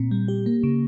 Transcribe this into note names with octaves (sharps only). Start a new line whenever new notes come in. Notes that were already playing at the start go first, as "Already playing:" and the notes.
Already playing: A#2 C4
G3
G4
A#3
C#3